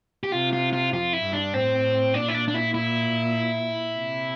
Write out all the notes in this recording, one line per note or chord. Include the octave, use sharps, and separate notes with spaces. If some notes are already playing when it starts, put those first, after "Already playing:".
G4
C3 F4
F4
F4
F2 F4
E4
G2
D4
A2 C4
A#2 D4
E4
D4
D4
E4
E4
C3